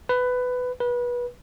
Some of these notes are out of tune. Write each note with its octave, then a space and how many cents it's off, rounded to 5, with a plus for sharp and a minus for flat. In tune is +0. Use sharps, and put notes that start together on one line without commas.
B4 +15
B4 -25